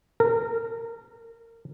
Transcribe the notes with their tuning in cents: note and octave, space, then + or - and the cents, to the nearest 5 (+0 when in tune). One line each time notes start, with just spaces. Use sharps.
A#4 -25